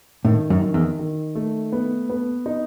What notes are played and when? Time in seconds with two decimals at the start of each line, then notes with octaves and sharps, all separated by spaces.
0.25 A2 D#3
0.50 F#2
0.62 D#3
0.74 E2
0.99 D#3
1.35 A3
1.72 B3
2.10 B3
2.46 D#4